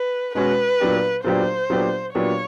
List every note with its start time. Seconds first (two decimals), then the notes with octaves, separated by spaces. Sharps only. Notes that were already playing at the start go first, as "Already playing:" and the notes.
Already playing: B4
0.35 B2 G#3 C#4 F#4 B4
0.80 A#2 F#3 B3 D4 G4
1.24 A#2 F#3 B3 D4 G4 C5
1.70 A#2 F#3 B3 D4 G4
2.15 A#2 F#3 B3 D4 G4 C#5